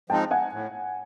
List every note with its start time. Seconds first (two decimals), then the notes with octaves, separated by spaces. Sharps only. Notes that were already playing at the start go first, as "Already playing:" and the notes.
0.10 F3 G#3 C4 D#4 G5 A5
0.31 F#5 G#5
0.52 A2